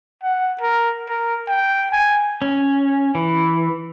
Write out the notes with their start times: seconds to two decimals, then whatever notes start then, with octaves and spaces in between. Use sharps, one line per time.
0.24 F#5
0.61 A#4
1.09 A#4
1.48 G5
1.92 G#5
2.42 C#4
3.15 E3